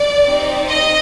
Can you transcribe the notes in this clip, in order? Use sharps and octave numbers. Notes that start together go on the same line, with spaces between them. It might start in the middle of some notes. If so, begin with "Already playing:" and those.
Already playing: D5
C4 D#4 G4
D#5